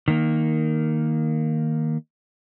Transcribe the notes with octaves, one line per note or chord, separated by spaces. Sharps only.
D#3 A#3